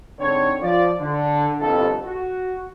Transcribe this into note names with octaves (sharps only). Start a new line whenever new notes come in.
G#2 D3 C4 C#5
F3 D5
D3
G1 C2 F2 G3 A4
F#4